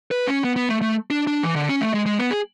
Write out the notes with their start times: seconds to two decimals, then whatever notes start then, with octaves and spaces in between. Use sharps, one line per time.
0.11 B4
0.27 C#4
0.44 B3
0.56 B3
0.69 A3
0.82 A3
1.10 D4
1.27 D4
1.43 E3
1.56 D3
1.69 C#4
1.81 A3
1.94 G#3
2.06 G#3
2.19 B3
2.31 G#4